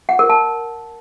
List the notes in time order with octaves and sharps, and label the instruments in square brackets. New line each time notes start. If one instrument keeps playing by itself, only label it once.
[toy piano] F#5
A#4
A5